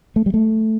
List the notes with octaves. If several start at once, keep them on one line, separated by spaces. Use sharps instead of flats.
A3
G3
A3